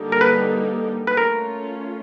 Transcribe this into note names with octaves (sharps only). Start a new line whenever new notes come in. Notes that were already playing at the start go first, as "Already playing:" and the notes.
Already playing: D3 G3 A#3 D#4 G4
A#4
B4
B4
A3 C#4 F4 A#4